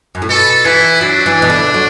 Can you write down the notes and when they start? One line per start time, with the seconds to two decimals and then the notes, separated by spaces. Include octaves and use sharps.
0.15 F#2
0.22 A2
0.29 B2 A4
0.65 E3 E4
1.01 F#3 D4
1.26 E3
1.42 B2
1.50 D3
1.74 F#3